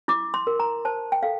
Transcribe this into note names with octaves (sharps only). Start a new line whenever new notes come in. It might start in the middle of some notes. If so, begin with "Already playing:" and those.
E4 D6
C6
A#4
A#5
C5 A5
G5
A4 F5